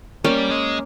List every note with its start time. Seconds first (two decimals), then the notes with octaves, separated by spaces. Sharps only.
0.24 G3 A#3 C#4
0.51 G#3